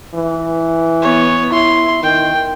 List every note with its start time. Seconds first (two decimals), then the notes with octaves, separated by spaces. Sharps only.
0.14 E3
1.02 B3 C#5
1.52 E4 C6
2.03 D#3 G5